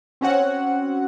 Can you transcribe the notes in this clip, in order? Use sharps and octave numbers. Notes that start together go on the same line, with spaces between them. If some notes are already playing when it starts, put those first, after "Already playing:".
C4 C#4 F#4 F#5